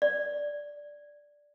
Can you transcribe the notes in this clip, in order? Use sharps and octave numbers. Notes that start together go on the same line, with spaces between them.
D5